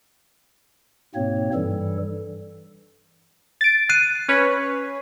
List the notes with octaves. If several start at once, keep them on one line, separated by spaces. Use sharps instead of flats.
G#2 B2 A#3 C4 C#5
G2 E3 G3 A4
A6 D7
F#6 C7 D#7
C#4 B4 C#5